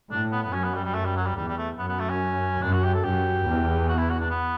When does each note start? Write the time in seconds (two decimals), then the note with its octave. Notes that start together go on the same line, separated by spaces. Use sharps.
0.11 A2 D4
0.32 B3
0.43 B3
0.53 F#2 C#4
0.64 B3
0.74 G3
0.84 G3
0.95 A3
1.05 G3
1.16 F#3
1.26 G3
1.36 E2 G3
1.48 G3
1.58 A3
1.78 F#2 B3
1.89 B3
2.00 A3
2.10 C#4
2.62 F#2 D4
2.73 F#4
2.83 G4
2.94 A4
3.04 F#2 G4
3.46 E2
3.88 F#4
3.98 E4
4.10 F#4
4.20 D4
4.30 B3